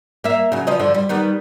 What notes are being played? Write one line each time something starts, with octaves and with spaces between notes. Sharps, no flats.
A#3 E5
C#3 F#3
F3 B3 D#5
G2 D3 F3
G3
D#3 G3 B3